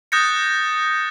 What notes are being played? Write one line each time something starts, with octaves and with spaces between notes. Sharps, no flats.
D#6 F#6 G6 A6 A#6 C#7